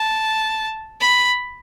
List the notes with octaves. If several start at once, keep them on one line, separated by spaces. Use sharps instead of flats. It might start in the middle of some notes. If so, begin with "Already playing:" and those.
Already playing: A5
B5